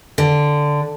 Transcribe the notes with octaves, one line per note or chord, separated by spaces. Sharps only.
D3